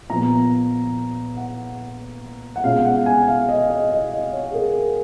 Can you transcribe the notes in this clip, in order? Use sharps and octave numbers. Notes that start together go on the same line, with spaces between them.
A#2 F3 B3 A#5
F#5
F#5
B2 G#3 C#4 F4 F5
F#5
G#5
F5
D#5
D#5
D#5
D#5
C#5
G#4
A#4